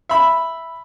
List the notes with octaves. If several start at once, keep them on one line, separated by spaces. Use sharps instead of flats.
E5 B5